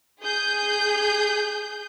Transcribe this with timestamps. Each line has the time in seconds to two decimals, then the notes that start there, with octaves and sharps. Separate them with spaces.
0.21 G#4 G6